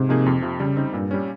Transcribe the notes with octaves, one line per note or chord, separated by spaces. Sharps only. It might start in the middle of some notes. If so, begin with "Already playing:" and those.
Already playing: G#2 C3
F3 A#3 D#4 G#4
F2
C3 F3
C#3 G3
C4 D#4
G2 A#2
G3 C#4